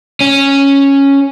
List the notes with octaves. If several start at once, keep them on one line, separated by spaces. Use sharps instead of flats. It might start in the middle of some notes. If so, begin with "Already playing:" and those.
C#4